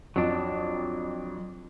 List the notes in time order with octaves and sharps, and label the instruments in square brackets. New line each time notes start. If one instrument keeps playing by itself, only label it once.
[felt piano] F2 [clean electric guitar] F#3 D4